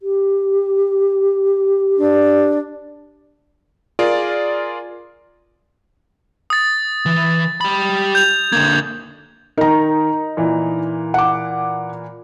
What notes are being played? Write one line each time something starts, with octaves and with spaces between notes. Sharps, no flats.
G4
D4
F4 G#4 A#4 D5
D#6 A6
E3
G4 B5
G6 F7
D3 A#3 G#6
D#3 D#4 A#4 A#5
A#2 E3
F#5 D6